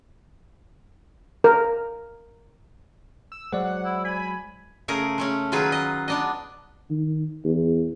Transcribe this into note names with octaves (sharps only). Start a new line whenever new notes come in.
A#4
E6
F#3 G#3 C5 D5 F#5
E4
G#5 B5
C#3 A3 G#4 A#4
G#3 A3 C#4
D#3 F#3 F4 G#4 B4
D#5
B3 D4 D#5
D#3
E2